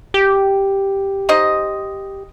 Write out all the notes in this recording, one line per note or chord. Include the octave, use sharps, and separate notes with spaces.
G4
D#4 C5 D#5